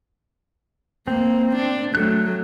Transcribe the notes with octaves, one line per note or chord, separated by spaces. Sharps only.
A#3 C4
D4
F#3 A3 A4 F#6